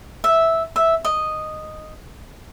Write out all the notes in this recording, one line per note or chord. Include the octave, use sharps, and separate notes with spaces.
E5
E5
D#5